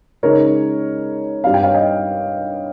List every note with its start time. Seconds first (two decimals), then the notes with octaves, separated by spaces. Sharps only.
0.23 C#3 G#3 D#4 A#4 C#5
1.44 G2 G3 C4 F5
1.54 G5
1.63 C#5 F5
1.74 D#5 G5